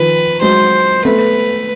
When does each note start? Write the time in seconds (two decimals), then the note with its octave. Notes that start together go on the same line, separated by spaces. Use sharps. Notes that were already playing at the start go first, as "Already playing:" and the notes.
Already playing: D#3 F3 B4
0.42 F#3 G#3 C5
1.05 A3 B3 B4